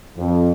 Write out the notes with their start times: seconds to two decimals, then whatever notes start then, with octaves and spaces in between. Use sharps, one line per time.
0.17 F2